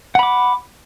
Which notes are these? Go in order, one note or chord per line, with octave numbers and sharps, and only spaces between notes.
F#5 B5 D6